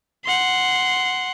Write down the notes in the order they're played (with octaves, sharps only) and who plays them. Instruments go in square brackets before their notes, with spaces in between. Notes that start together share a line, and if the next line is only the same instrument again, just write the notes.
[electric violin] F#5 C6